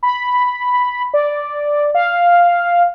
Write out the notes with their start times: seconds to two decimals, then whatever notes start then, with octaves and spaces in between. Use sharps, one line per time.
0.03 B5
1.14 D5
1.95 F5